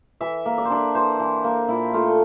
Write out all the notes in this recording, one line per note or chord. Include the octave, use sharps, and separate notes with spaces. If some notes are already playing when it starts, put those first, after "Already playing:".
E3 E5
A#3
D5
C5
D4 D5
E3 C5
E3
A#3
A#2 E4
A3 F4